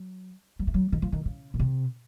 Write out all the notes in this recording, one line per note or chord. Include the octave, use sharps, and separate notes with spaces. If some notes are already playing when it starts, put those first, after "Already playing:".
Already playing: F#3
F#3
A3
F#3
D#3
F3
D#3
C#3
A#2
C3